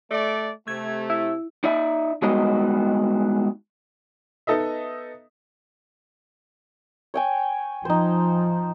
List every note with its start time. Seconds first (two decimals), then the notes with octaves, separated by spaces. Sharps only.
0.11 A3 D5
0.68 C3 A3 G#6
1.10 E4
1.64 D#4 D5 E5
2.22 G3 G#3 B3 D#4 F#4 D#5
4.47 B3 D#4 A4 D#5 E5
7.14 C#5 G5 G#5
7.85 F3 D#4 C5